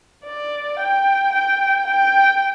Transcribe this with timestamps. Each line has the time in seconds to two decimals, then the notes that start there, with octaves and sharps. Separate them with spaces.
0.24 D5
0.79 G5
1.33 G5
1.87 G5